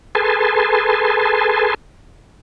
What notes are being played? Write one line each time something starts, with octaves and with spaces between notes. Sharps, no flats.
G#4 A4 B4 G#5 A5 C6